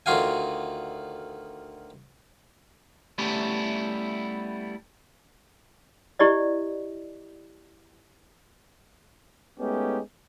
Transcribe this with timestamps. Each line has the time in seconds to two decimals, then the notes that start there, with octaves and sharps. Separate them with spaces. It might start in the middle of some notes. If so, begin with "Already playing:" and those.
0.06 D2 D#3 F4 F#4 F5 G#5
3.18 G3 A3 B3 C#4 E4 G4
6.19 E4 G4 D5 D#5
9.59 G#3 A3 B3 C#4 D#4 G4